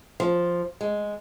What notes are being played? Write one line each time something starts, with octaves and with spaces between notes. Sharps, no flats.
F3
G#3